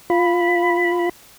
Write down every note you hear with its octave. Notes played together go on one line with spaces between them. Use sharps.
F4 B5